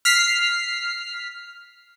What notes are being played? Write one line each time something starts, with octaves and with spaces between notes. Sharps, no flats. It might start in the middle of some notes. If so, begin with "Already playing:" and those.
F6 B6 C7